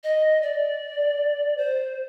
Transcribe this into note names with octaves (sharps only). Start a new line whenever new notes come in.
D#5
D5
C5